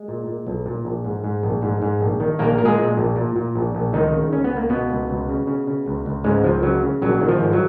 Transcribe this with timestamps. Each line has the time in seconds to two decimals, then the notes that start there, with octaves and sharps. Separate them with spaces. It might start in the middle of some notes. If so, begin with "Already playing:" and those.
Already playing: G#3
0.08 A#2
0.27 A#2
0.47 B1
0.66 A#2
0.85 A#1
1.05 G#2
1.24 G#2
1.43 A#1
1.62 G#2
1.82 G#2
2.01 A#1
2.20 D#3
2.39 A#1 A#3 A#4
2.58 A#2 A#4
2.65 G#3 G#4
2.78 A#2
2.97 A#1
3.16 A#2
3.36 A#2
3.55 A#1
3.75 A#1
3.93 C#2 D#3 D#4
4.13 C#3
4.32 C#2 C#4
4.44 B3
4.51 C#2
4.57 A#3
4.69 C#2 B2 B3
4.91 C#2
5.10 C#2
5.29 C#3
5.47 C#3
5.67 C#3
5.86 C#2
6.06 C#2
6.24 G#2 C#3 G#3
6.44 C#2 F3
6.63 C#3 F#3
6.83 C#3
7.02 A#1 F#3
7.21 D#3
7.28 F3
7.40 G#2
7.53 F#3